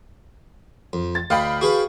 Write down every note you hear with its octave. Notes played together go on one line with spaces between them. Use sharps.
F2
A6
D2 D#5 F5 G5 B5
F#4 G#4 B4